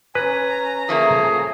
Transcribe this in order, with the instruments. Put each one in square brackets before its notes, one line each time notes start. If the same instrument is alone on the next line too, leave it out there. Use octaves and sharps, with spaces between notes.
[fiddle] C#4 A#5 [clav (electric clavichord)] B4 [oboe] G#5
[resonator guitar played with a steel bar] F3 A3 A#3 [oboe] G#4